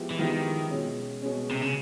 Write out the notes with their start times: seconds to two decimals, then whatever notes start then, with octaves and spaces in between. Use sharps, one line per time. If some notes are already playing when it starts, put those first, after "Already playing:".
Already playing: F3 G#3 B3 E4 G4
0.11 E3
0.19 D#3 F3 G#3 B3 E4 G4
0.71 B2 G#3 C#4
1.22 B2 G#3 C#4
1.51 C3
1.62 C#3